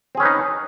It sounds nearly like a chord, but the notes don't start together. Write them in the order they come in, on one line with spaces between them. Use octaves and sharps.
C4 G#4 C#4 B4 D#4